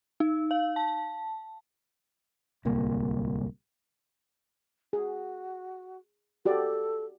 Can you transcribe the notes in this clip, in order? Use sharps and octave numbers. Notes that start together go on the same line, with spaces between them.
D#4
F5
A5
D1 C2 A#3
F#4 G#4
F#4 G4 A4 D5